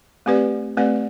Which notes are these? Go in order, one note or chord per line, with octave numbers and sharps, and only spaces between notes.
A3 C4 G4 B4 D5
A3 C4 G4 B4 D5